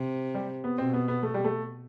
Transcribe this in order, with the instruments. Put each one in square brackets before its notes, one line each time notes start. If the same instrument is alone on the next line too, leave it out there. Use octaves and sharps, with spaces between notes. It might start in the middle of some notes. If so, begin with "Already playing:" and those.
Already playing: [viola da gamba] C3
[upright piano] G3
B3
[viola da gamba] B2 [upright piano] C4
[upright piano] B3
B3
A3
G3
A3